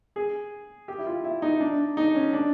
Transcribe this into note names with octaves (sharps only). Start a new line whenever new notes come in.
G#4
G4
E4
F4
E4
D#4
D4
D#4
C#4
D4